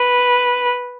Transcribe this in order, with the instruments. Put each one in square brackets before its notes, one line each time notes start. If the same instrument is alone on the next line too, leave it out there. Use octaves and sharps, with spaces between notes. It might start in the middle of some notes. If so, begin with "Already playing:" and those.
Already playing: [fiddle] B4